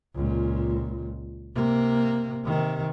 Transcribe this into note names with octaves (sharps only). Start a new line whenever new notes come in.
C#2 A#2
C3 A#3
C3 D#3